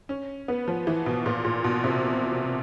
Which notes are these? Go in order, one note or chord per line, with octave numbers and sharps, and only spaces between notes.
C#4
B3
F3
E3
B2
A#2
A#2
B2
C3